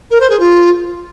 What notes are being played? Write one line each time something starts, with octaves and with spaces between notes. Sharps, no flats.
A#4
C5
G#4
F4